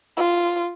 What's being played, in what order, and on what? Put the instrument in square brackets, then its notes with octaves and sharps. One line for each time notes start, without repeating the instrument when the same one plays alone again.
[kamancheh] F4